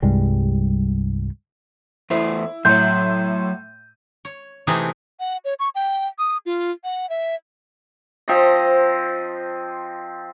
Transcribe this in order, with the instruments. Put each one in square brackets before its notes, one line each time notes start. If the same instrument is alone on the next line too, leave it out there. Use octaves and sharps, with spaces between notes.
[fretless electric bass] C2 G2 G3 G#3
[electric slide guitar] E2 A3 C5 [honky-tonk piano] E4
[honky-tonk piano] A2 E5 C6 [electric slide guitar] F#3 C#5 [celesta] G6
[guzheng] C#5
[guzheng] C3 E3 A3 [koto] C4 D#4 G#4
[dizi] F#5
C#5
C#6
G5
D#6
F4
F#5
E5
[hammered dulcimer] F3 C4 C5 D#5